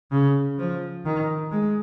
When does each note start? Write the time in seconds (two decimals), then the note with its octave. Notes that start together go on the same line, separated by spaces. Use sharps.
0.12 C#3
0.59 F3
1.06 D#3
1.51 G#3